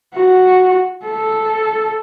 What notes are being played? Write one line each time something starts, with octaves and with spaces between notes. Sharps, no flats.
F#4
A4